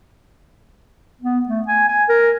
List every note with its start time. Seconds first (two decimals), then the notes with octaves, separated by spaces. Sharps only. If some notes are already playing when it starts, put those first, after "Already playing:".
1.22 B3
1.49 A3
1.68 G#5
1.88 G#5
2.09 A#4